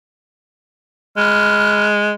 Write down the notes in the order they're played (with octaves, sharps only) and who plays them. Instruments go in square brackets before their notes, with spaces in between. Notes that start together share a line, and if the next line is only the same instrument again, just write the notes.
[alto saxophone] G#3 [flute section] B5 F6 F#6